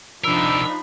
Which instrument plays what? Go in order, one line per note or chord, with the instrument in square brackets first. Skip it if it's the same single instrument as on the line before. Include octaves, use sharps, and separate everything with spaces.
[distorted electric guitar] C3 A#4 [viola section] F3 D4 D#4 [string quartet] B5 [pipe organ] E6